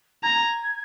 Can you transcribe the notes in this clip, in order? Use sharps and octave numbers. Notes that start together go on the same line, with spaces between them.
A#5 G#6